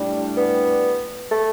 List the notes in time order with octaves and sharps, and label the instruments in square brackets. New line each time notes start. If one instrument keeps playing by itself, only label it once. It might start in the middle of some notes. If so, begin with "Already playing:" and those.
Already playing: [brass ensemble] A2 G3 D4
[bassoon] B3
A3